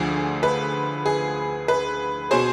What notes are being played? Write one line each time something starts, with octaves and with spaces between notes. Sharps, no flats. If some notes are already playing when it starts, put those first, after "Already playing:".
Already playing: D2 D3 F3 G#4
B4
G#4
B4
B2 G#4 C5